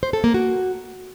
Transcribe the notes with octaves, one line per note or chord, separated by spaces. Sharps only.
C5
A4
A#3
F#4